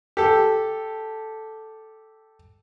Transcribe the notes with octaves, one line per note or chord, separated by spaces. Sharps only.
G4 A4